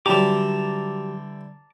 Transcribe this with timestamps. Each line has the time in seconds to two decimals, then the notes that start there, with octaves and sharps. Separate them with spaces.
0.06 D3 E3 F#3 G3 G4 A5 A#5 D6